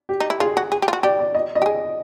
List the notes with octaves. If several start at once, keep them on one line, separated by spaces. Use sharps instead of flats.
G4
D#4
E4
F4 G#4
F#4
G#4
G4
F4
F#4
G4 D5
D5
D#5
D#5
G4
G#4